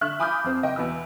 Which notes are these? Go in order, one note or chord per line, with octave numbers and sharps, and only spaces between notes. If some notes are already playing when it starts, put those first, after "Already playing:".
D3 E5 C#6 F6 F#6
G#5 B5 D6 D#6 F6 G6
F2 C4
F#1 D#5 G5
E2 B2 B4 E6